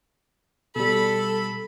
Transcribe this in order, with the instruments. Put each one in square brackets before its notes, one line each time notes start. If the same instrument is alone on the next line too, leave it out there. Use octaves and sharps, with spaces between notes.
[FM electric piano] B2 G3 [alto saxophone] A4 [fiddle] B5